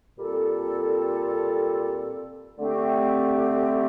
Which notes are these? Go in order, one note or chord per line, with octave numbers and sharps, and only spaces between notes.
A#2 G3 C4 F4 A4
D3 A3 C4 G4